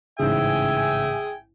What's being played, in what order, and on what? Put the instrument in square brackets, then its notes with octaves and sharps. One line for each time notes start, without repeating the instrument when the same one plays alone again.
[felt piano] A1 G#2 C#3 [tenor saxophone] G#4 [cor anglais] E5 [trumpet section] G5 G#5